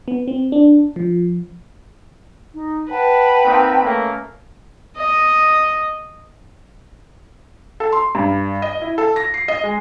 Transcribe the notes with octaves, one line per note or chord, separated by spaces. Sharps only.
B3
C4
D4
F3
D#4
B4 F#5 G5 A5
A#3 C4 D#4
A3 A#3 C#4
D#5
A4
C6
G2
D#5
E4
A4
A#6
C7
D#5
G#3